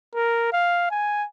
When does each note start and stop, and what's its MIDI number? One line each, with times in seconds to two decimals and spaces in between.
0.15 0.49 70
0.53 0.86 77
0.91 1.25 80